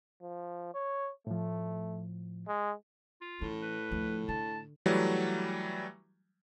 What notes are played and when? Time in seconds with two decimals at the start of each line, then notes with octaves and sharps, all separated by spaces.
0.22 F3
0.74 C#5
1.27 A2 F3 A3
2.48 G#3
3.21 F4
3.41 A2 E3 C#4
3.62 B4
3.91 D2 F3
4.28 D3 A5
4.86 E3 F#3 G3 A3